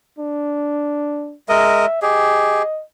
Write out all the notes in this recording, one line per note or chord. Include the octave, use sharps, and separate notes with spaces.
D4
G#3 A#4 D#5 E5
G4 G#4 D#5